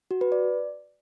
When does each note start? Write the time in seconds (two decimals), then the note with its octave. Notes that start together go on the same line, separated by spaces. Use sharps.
0.11 F#4
0.21 B4
0.32 D5